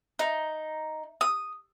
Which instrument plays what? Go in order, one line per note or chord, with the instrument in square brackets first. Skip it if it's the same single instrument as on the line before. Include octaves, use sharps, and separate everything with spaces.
[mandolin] D#4
D#6